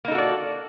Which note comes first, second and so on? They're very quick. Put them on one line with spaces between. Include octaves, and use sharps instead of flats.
A#3 D#4 A4 F#4 D5